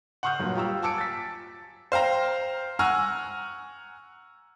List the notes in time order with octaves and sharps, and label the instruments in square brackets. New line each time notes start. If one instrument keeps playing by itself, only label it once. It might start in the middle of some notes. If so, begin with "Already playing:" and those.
[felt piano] F#5 C6 C#6 D#6 F6 G6
G2 A#2 F#3
F4 G4 A#5 E6
G#5 A5 D6 E6 C#7 D7
A6 B6
[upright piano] C5 F5 G5 A#5
F#5 G#5 A#5 C#6 E6 F6